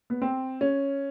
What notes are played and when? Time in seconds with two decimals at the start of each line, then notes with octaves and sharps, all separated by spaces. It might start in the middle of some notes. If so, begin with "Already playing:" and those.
0.10 B3
0.22 C4
0.61 C#4